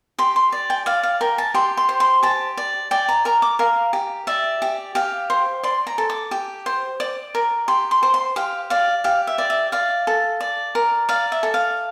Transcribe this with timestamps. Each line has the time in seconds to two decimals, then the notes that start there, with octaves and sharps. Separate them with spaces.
0.19 G4 C6
0.36 C6
0.52 D5
0.70 G5
0.86 D5 F5
1.03 F5
1.21 A#4 G5
1.38 A5
1.54 G4 C6
1.77 C6
1.89 C5
2.00 C6
2.23 G4 A5
2.57 D5
2.91 D5 G5
3.09 A#5
3.25 A#4 A#5
3.42 D6
3.59 A#4 F5
3.93 G4
4.27 D5 E5
4.62 G4
4.95 G4 F5
5.30 C5
5.63 D5 C6
5.87 A#5
5.98 A4
6.10 D6
6.31 G4
6.66 C5
7.00 D5
7.35 A#4
7.68 G4 C6
7.91 C6
8.03 C5
8.14 C6
8.36 G4 F5
8.70 D5 F5
9.04 G4 F5
9.27 E5
9.38 D5
9.50 E5
9.72 D5 F5
10.07 A4
10.40 D5
10.75 A#4
11.09 D5 F5
11.32 E5
11.43 A4
11.54 F5